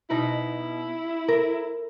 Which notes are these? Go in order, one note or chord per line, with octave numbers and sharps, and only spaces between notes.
B2 D#4 E4
A#4